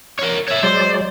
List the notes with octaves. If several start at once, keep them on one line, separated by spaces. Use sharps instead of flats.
A#4 C#5
C#5 E5
F#3 G#3 C5 D5